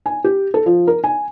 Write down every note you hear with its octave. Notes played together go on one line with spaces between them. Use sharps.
G#5
G4
A4
F3
A#4
G#5